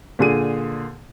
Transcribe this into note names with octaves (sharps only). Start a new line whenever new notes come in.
A#2 D3 G#4 D#7